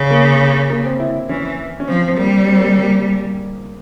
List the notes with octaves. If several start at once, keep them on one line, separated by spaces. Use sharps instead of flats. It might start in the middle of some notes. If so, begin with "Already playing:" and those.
Already playing: C#3
A#3
A#3
C4
E4
E4
E3 C#4
C#4
F3 C4
C4
G3 A#3
C4
A#3
G#3
A#3